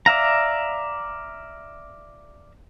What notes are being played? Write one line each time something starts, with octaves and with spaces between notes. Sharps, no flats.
D5 E5 F5 A#5